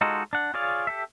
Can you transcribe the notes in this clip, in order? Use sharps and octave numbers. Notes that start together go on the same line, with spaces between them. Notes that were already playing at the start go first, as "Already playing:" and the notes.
G#3 D#4 F4 F#4 A4
D4 F#5
F4 G#4 C#5 D5 F5
G4 A4 E5